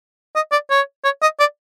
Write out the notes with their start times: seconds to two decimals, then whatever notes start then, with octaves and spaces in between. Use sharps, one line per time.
0.36 D#5
0.52 D5
0.70 C#5
1.04 C#5
1.22 D#5
1.40 D5